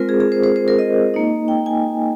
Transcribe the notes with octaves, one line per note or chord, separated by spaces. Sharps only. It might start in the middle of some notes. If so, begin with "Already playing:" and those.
Already playing: G#3 C4 F4 A#4 C5
G#4
G#4
C5
C5
C5
A#4
D#5
A#3 D#4
G5
G#5